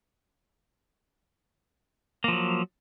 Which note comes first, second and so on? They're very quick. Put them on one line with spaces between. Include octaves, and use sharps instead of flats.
A#3 F3 F#3